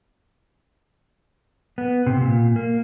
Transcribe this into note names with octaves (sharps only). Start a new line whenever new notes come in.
B3
C3
A#2
A#3